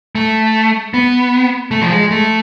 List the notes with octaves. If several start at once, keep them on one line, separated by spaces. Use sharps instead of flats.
A3
B3
A3
F3
G#3
A3